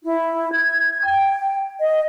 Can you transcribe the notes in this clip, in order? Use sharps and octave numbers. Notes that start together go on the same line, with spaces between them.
E4
G#6
G5
D#5